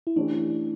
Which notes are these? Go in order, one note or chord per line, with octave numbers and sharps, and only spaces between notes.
E4
E3 A3 C#4 D4 G4
D4
D4